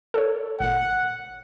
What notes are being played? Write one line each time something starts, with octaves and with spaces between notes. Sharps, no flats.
A4 A#4 C#5
G#1 A#2 F#5